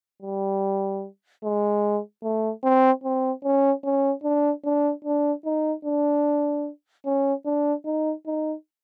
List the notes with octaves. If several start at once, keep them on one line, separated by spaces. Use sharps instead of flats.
G3
G#3
A3
C4
C4
C#4
C#4
D4
D4
D4
D#4
D4
C#4
D4
D#4
D#4